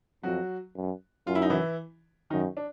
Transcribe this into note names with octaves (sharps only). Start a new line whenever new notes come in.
F2 F#3 F#4
F#2
F#2 F4
E4
D#4
E3 E4
F#2 D#3 D#4
D4